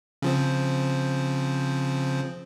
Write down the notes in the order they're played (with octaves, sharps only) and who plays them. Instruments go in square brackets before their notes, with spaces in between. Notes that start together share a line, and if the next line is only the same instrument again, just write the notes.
[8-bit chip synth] C#3 F3 C4